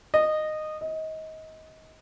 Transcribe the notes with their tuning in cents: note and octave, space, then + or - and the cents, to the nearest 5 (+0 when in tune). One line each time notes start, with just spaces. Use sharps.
D#5 -15
D#5 +25